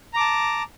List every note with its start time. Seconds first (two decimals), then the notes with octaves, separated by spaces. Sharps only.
0.14 A#5
0.17 D6
0.20 A5